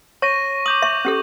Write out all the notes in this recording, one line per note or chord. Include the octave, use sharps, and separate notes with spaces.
C#5 C#6 A#6 D#7
D6 D#6 G6 F#7
E5 C#6
C#4 G4 A4